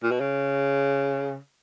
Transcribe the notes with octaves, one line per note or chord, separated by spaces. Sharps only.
A#2
B2
C#3